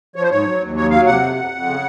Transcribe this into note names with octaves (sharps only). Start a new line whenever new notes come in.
F3 C#5
C5
G#2 C#5
F#3
D#2
F#3 C#5
F#3 F5
C3 F#5
F2
F2
F2
C#3